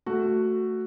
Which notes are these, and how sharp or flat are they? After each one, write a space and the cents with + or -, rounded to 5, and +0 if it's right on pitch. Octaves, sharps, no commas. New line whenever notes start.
A3 +10 F#4 +0